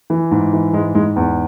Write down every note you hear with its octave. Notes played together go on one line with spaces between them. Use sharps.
E3
G#2
E3
G#2 G#3
G#2 G#3
E2